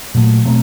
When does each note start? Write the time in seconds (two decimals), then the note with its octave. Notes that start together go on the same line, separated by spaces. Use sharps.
0.14 A#2 F#3 A3
0.45 B2 F#3 A3 C4